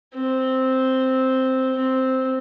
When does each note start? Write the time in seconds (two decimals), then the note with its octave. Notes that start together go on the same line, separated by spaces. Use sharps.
0.14 C4
1.76 C4